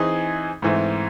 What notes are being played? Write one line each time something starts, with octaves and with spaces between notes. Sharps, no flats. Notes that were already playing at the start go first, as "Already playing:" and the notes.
Already playing: E3 C4 D#4 G#4
G#2 E3 A3 C4